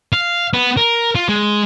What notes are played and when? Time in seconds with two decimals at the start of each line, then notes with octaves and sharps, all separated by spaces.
0.13 F5
0.53 B3
0.77 A#4
1.15 F4
1.29 G#3